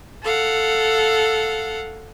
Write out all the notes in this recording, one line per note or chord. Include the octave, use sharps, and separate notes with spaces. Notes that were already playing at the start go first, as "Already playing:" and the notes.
A4 F5 F#5